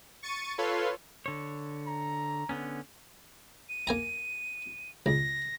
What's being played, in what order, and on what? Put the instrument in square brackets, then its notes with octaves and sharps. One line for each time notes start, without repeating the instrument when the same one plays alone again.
[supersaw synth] C#6 A6 C#7 D#7
F4 A4 B4 C#5 F5 C6
[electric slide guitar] D3 C#5
[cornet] A#5
[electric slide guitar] D3 B3 C#4
[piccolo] D#7
[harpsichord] A#3 G#5 A#5
[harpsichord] C#2 [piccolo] A#6